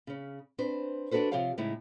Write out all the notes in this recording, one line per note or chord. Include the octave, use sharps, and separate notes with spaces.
C#3 C#4
C4 D4 B4 C5
D4 F#4 A4 B4 C5
C3 F3 G4 C#5 F5 G5
A2 C#3 G#3 D#4 E4